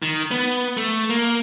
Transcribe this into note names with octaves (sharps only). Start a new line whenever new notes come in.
D#3
B3
A3
A#3